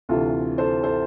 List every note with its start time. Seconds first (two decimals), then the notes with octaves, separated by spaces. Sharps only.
0.09 D2 C3 E3 F4 A4
0.58 A4 C5
0.83 A4 C5